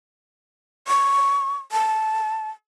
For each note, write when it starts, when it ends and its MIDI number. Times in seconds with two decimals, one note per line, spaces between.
0.88 1.57 85
1.72 2.50 81